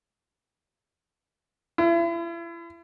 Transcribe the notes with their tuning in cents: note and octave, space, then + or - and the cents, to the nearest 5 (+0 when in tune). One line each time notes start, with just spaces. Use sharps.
E4 +40